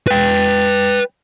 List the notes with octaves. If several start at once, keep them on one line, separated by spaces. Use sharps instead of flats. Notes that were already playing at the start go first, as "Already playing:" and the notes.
B4 G5